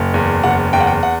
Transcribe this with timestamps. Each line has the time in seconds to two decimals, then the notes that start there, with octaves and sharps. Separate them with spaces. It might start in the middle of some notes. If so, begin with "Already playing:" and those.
Already playing: F#1
0.14 E2
0.44 F#1 F#5
0.73 E2 G5
0.80 F#5
0.87 G5
1.03 F#5